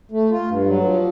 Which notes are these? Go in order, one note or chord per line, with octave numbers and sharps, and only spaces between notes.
A3
F4
G2
F#3
F3